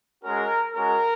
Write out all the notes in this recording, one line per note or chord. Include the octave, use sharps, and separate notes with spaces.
G#3 C#4 F#4 A#4
G#3 C#4 F#4 A#4